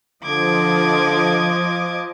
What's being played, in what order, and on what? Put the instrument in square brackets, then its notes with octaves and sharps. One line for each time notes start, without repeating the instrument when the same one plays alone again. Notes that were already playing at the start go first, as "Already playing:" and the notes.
[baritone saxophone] D3 [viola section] F3 D#5 [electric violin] D6 G#6